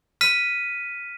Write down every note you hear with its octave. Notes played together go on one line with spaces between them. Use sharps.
F6 B6 D#7